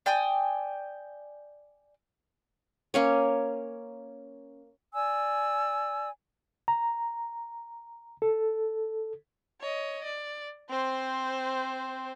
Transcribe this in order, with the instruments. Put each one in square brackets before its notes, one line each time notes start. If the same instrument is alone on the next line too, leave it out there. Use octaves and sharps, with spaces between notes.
[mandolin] D5 G5 G#5 D#6
[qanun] A#3 C#4 C#5
[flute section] D5 G#5 E6
[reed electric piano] A#5
A4
[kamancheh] C#5 D#5
D5
C4 C5